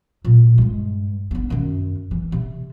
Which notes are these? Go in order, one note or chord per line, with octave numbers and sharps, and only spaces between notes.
A#2 F#3
G2 G#3
B3 D4
F#2 D#3
E3
C3